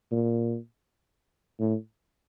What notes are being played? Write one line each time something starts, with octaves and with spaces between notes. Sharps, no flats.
A#2
A2